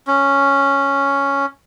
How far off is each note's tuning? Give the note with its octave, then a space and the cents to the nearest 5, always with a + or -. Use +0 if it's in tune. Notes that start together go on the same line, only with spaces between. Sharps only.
C#4 +0